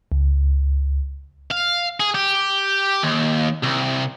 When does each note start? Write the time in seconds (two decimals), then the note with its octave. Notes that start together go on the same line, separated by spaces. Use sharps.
0.12 C#2
1.51 F5
2.00 G#4
2.14 G4
3.03 D#2
3.63 C2